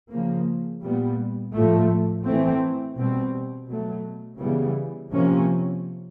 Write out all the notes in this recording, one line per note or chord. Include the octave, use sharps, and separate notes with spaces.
C#3 F3 A#3
A#2 G3 B3
A2 F3 A3
E3 A3 C4
B2 G3 C4
B2 F#3 A3
C#3 E3 G3 B3
C3 F3 A#3 C#4